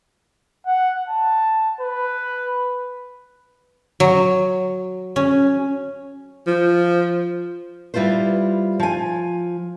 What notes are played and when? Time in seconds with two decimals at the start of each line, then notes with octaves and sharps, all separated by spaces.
0.66 F#5
1.08 A5
1.81 B4
4.00 F#3
5.16 C#4
6.47 F3
7.94 G3 E4 F4 B4 C5
8.80 F3 G#5